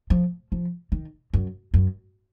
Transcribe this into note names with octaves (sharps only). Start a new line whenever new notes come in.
F3
F3
D#3
F#2
F#2